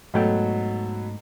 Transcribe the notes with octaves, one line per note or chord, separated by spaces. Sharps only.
G#2 B2 F#3 A3 A4 G5